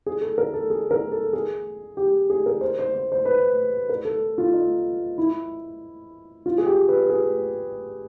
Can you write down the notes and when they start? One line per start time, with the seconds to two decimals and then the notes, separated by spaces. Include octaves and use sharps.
0.06 G#4
0.21 A4
0.38 A#4
0.54 A4
0.70 G#4
0.91 A#4
1.12 A4
1.33 G#4
1.97 G4
2.30 G#4
2.46 A#4
2.61 C5
2.79 C5
2.95 C5
3.12 C5
3.25 B4
3.89 A#4
4.05 A4
4.38 F4
4.54 D#4
5.18 E4
6.46 F4
6.58 G#4
6.66 G4
6.88 B4
7.09 G#4